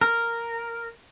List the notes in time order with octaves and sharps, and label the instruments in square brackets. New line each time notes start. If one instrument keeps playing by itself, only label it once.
[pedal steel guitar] A#4